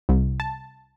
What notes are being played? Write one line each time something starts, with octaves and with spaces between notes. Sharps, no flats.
C2
A5